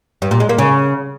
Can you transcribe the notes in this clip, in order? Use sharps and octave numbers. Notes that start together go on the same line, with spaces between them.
G2
A#2
G#3
A#3
C#3